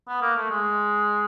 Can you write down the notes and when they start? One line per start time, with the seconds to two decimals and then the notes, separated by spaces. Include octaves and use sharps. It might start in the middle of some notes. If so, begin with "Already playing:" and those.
0.08 B3
0.22 A#3
0.36 A3
0.50 G#3